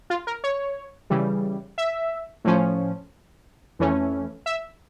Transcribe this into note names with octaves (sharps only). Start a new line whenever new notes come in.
F4
A#4
C#5
C#3 E3 G3
E5
A2 F3 C#4
F2 E3 A3 C#4
E5